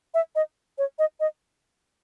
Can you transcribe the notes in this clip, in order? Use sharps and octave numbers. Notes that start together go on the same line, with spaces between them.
E5
D#5
C#5
D#5
D#5